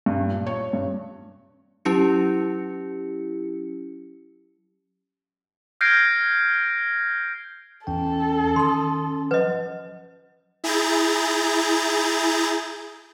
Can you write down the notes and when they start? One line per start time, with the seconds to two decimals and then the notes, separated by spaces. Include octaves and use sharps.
0.06 G2
0.31 A#2
0.47 C#5
0.73 G2
1.85 F#3 C#4 E4 G4 C#7
5.81 F6 G6 G#6 A#6 C7 D7
7.87 E2 E3 C#4 A4 G5
8.56 D#3 C6 D#6
9.31 F3 F#3 B4 D#5 F#5
10.64 E4 G#4 A#5 G6 A6